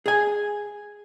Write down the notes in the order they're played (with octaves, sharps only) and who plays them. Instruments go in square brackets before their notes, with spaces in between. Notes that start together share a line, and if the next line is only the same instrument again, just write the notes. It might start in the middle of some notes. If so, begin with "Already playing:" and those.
[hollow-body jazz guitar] G#4 G#5